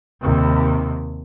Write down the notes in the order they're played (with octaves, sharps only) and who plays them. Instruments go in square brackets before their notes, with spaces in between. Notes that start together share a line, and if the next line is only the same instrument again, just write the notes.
[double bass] D#2 C3